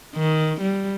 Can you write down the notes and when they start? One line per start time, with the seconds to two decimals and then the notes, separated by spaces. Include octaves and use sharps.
0.15 D#3
0.61 G3